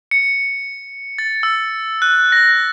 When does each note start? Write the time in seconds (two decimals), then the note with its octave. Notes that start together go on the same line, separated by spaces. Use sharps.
0.11 C#7
1.18 A6
1.43 E6
2.02 F#6
2.32 A#6